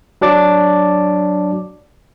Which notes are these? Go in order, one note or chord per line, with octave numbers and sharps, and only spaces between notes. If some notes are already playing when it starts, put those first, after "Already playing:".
F#3 D4 D5 D6